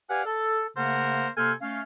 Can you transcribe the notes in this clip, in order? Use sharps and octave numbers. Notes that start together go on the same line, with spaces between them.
G4 B4 D5 F5 F#5 G#5
A4
C#3 A3 A#3 A#4 C5 F#5
C3 A#3 A4 C5 G#5 F6
A3 C#4 F5